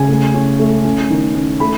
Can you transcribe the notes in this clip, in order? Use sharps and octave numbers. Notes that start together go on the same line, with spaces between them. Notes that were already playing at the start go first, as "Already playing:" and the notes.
Already playing: C#3 G#5
A3
C#4
A3
C#4
D#3
C#4
A3 B5